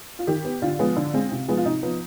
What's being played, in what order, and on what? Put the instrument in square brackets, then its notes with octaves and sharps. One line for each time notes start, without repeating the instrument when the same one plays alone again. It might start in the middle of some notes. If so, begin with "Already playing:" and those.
[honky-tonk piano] F4
D#3 G4
B3
D3 F4
F3 G#3 B3
D3
G#3 C4
C3
F3 G#3 B3
F4
C3 D#4
F3 B3